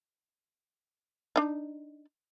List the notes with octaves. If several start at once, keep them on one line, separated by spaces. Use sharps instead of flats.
D4 D#4